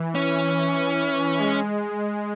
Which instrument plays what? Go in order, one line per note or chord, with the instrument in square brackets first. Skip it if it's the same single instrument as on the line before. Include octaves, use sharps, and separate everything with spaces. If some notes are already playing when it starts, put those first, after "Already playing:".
Already playing: [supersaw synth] E3
[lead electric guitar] C#4
[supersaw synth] G#3